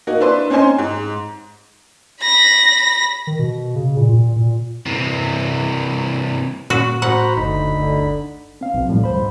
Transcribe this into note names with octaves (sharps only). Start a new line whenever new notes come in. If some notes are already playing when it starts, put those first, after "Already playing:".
A#3 D#4 F#4
D4 E4 B4 C6
C4 C#4 D#4 C5 G#5 C6
G#2
B5 A#6
D#3
B2
C#3
A#2
A#2
A#2
C3 E3
A#2 F#4
A2 F#4 C5 F#5 A#5 B5
F#1 D2 A2 D#4 B5
G1 D3
C4 F5
B1
A2 F3 G3
D2 C5 B5
G#2